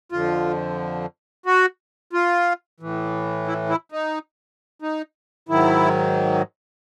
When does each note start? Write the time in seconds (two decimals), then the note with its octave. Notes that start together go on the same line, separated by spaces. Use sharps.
0.12 F2 D3 F3 F4
1.46 F#4
2.13 F4
2.80 A2 E3
3.47 E4
3.69 E4
3.92 D#4
4.82 D#4
5.48 G#2 D#3 F#3 E4